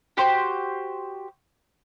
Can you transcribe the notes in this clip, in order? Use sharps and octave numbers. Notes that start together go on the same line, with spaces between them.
F#4 G4 C5 C6